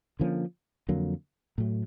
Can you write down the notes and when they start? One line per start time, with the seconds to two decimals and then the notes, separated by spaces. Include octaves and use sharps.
0.19 D3 F3 A#3 C#4
0.89 F2 D3 F#3 A#3
1.58 A2 F#3 A3